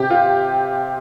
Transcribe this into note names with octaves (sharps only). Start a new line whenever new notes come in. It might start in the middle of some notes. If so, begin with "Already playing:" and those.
Already playing: C3 G4
F4